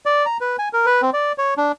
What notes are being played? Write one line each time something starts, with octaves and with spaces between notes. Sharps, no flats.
D5
A#5
B4
G#5
A#4
B4
C4
D5
C#5
D4